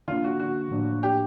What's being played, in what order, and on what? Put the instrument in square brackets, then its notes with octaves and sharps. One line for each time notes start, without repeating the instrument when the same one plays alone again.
[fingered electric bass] D3 F3 A#3 D4 [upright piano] F4
[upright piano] F#4
F#4
[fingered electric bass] A2 F3 A#3 D4
[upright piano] G4